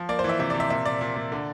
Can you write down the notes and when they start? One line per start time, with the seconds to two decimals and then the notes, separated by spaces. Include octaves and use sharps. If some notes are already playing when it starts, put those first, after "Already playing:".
Already playing: F3
0.09 A#3 D5
0.19 C5
0.24 E3
0.29 E5
0.39 C3 E5
0.50 C3 D5
0.60 E5
0.70 A#2 E5
0.86 A#2 D5
1.01 A#2
1.16 A#2
1.32 D3